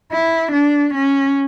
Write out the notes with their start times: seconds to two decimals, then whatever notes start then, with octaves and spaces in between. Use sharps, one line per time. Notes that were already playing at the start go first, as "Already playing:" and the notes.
0.11 E4
0.52 D4
0.94 C#4